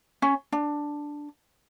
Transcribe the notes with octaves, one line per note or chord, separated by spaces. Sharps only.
C#4
D4